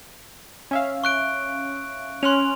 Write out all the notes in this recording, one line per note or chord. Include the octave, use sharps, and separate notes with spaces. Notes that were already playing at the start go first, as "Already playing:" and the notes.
C#4 E5 F5
C#6 F#6 D7
C#4 C6 F6 F#6 F7